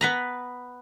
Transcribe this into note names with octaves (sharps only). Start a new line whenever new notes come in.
B3 B4 A#5